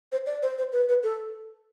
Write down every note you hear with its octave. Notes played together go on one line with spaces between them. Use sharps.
C5
D5
C5
C5
B4
B4
A4